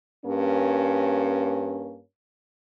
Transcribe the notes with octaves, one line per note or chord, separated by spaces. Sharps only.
G2 A#3 C#4